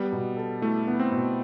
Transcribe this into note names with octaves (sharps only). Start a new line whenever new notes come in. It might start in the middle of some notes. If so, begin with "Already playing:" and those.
Already playing: G3 B3
B2
A4
A3 E4
B3
C4
B2